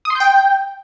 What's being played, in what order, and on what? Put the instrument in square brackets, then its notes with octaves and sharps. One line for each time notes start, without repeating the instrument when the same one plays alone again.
[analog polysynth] D#6
C6
G6
G5